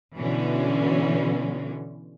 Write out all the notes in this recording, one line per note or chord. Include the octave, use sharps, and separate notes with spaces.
B2 D3 E3 C#4